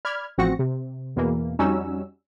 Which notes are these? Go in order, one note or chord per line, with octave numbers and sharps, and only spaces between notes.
D5 B5 F6 G#6
A1 F3 C4 F#4 A#6 C#7
C3
E2 B2 E3 A#3
F2 G3 C#4 D#4 F#4 E6